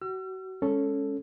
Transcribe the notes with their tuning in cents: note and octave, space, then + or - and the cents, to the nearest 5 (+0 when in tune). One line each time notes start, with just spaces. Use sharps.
F#4 +30 E6 +45
G#3 -10 C#4 +0 A4 +0